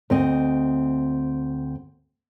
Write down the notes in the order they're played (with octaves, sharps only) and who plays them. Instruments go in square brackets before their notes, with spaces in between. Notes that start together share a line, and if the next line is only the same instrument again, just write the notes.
[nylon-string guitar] D2 C4 D#5